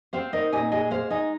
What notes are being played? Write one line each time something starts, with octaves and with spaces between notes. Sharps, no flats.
C4 C5 F5
D#4 A#4 D#5
A#2 D#5 G#5
G#3 D#5 G#5
G#3 C5 F5
D#4 D#5 G#5